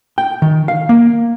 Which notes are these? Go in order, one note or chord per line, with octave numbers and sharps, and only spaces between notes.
G5
D#3
F5
A#3